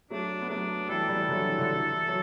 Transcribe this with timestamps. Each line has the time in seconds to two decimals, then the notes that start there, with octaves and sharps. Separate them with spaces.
0.10 F#3 A3 D4
0.42 B3
0.49 F#3 A3 D4
0.89 E3 G3 A4
1.09 E3 G3
1.28 D3 F#3
1.49 E3
1.59 D3
1.68 E3
2.07 F#3